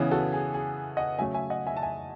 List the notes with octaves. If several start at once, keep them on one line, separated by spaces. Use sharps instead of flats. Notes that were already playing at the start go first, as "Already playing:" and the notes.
Already playing: C#3 E3 B3
F#4 A4
G#4
G#4
D#5 F#5
C#3 F#3 A3 E5 G#5
E5 G#5
D#5 F#5
E5 G#5
A5
E5 G#5